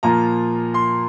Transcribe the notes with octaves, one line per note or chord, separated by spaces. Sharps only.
A#2 F3 A#3 F4 A#5
C6